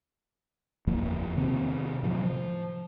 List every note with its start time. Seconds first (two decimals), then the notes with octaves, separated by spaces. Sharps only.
0.87 F#1 E2 F3 A#3
1.37 C3 D#3 B3 C4
2.03 A2 C3 F3 F#3
2.22 F3